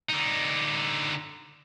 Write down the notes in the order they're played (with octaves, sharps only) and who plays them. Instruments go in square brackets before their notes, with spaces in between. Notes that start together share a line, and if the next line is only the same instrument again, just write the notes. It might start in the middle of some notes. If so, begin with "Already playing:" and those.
[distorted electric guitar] D3 D#4